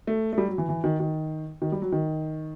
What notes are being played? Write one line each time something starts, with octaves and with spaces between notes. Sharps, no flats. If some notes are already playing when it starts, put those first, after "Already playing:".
A3
A3
G3
F#3
E3
E3
D#3
D#3
D#3
G3
F#3
D#3